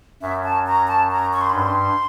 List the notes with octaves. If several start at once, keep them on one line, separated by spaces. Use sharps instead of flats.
F#2 E5
A5
A#5
A5
A#5
C#6
C6
B5
G2 C6